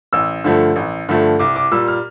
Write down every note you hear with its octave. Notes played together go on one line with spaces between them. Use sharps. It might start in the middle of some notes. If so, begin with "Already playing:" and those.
A1 E6
G2 D3 F3 A3
A1
G2 D3 F3 A3
C2 D6
D6
A#2 G3 E6
F6